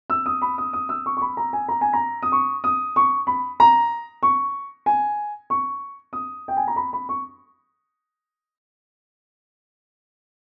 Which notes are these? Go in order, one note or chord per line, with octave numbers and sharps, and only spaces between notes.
E6
D#6
B5
D#6
D#6
E6
C#6
C#6
B5
A#5
G#5
A#5
G#5
A#5
D#6
C#6
D#6
C#6
B5
A#5
C#6
G#5
C#6
D#6
G5
G#5
A#5
B5
B5
C#6